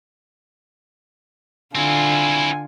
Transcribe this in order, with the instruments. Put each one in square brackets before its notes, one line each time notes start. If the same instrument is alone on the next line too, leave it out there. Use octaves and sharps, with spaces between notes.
[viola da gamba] D3 F4 [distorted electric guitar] C4 E4 [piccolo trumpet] G#5